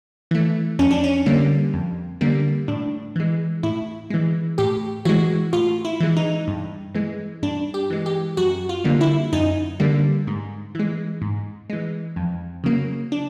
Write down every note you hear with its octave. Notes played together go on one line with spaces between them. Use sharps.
E3 A3
F2 C#4
D4
C#4
D3 G3 A#3
F2
D3 G3 A#3
A2 D4
E3 G#3
A2 E4
E3 G#3
A2 G4
E3 G#3 F#4
A2 F4
E4
E3 G#3
D#4
G2
E3 G#3
G2 D4
G4
E3 G#3
G4
F#2 F#4
F4
D3 G3 A#3
E4
F#2 D#4
D3 G3 A#3
G#2
E3 G#3
G#2
E3 G#3
F2
C#3 F#3 A#3
D4